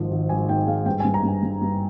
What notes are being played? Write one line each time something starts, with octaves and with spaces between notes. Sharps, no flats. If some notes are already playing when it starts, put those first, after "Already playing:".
Already playing: G#1 G#2 F3
G#1
G#1 G#5
G#2 G5
G#3 F5
G2 G5
G#5
G2
A#5
G2 G#5
G2
G2